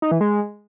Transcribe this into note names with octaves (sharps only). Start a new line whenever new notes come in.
D#4
E3
G#3